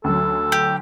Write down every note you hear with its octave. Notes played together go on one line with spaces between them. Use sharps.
D2 F#3 A4
G4